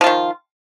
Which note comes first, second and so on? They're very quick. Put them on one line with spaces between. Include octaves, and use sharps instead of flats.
F3 F4 D#3